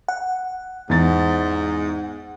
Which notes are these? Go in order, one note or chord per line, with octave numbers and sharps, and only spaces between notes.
F#5
E2 G#2 A6